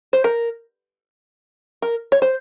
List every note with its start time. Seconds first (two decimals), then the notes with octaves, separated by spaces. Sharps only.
0.13 C5
0.24 A#4
1.82 A#4
2.12 C#5
2.22 C5